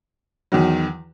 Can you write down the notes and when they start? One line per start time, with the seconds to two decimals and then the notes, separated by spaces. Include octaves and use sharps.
0.52 E2 D#3 F#3